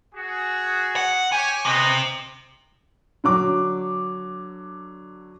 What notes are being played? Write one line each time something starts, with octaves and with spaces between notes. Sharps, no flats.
F#4 G#4
F#5
G4 C#5 G#5
C3 B4 D#5
D3 F#3 D6